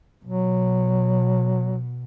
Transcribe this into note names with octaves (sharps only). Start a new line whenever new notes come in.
B2 F#3